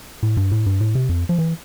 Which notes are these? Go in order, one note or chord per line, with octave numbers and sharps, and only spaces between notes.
A2
G2
A2
G2
A2
C3
F2
F3
E3